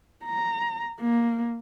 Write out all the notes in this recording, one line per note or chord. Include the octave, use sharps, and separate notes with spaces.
A#5
A#3